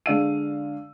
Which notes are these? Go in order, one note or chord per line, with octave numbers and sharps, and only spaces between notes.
D3 G#3 D5 F5 E6 D#7